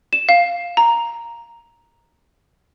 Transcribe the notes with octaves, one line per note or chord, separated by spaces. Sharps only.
E7
F5
A#5